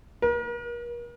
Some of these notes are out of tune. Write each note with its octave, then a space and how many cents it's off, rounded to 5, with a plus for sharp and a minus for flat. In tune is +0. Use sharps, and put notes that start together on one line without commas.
A#4 +40